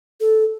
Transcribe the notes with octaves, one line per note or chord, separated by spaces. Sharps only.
A4